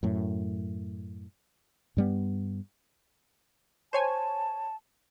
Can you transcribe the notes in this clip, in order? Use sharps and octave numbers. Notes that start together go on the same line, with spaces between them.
F#2 A2
G2 G3 B3
C5 C#5 G#5 A5